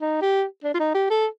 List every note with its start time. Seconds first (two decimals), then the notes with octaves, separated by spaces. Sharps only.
0.01 D#4
0.21 G4
0.64 D4
0.74 F4
0.80 D#4
0.94 G4
1.10 A4